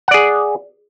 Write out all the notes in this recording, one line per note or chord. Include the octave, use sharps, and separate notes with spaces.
G#4 D5 F#5